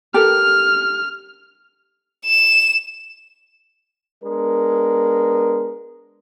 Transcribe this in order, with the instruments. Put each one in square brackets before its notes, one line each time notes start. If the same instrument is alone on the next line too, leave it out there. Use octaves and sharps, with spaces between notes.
[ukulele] G4 A4 A#4 [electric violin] F6
[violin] E7
[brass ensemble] G#3 B3 D4 A#4